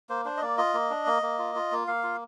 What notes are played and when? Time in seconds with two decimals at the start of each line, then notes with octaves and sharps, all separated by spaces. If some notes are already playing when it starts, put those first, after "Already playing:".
0.09 A#3 C5
0.25 D4 C5
0.37 D#5
0.42 A#3 D5
0.58 F4 D#5
0.74 A#3
0.90 D4
1.07 A#3
1.22 A#3
1.39 F4
1.55 F4
1.72 A#3
1.88 A#3 F5
2.03 F4